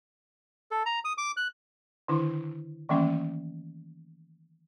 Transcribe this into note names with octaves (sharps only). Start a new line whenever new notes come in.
A4
A#5
D#6
D6
F#6
D3 D#3 D4 E4
D#3 E3 G3 A3 A#3 C#4